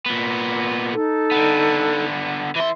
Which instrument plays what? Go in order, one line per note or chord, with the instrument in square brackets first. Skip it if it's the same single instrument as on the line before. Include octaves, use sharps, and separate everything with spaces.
[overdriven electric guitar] A#2 B3
[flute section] D#4 A4
[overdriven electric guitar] D3 B3
[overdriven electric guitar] E3 C6 [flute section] E5